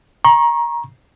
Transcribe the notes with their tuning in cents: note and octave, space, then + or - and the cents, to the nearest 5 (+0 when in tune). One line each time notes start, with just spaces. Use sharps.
A#5 +20 C#6 -25